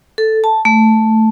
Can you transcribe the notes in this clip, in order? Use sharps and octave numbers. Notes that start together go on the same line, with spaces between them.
A4
A5
A3